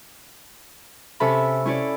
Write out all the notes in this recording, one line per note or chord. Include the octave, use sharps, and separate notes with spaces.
C3 C#4 A4 E5 B5
C#4 E4 C#5 D5